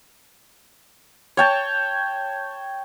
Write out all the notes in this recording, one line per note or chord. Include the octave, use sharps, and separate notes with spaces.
C#5 G5 A5